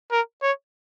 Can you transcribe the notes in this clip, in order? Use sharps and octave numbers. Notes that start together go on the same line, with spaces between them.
A#4
C#5